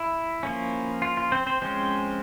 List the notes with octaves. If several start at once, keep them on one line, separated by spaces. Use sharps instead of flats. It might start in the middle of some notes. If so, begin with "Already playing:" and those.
Already playing: E4
F3 A#3 C#4
F4
F4
C4 C5
C4 C5
F3 G#3 C4 C#4 C5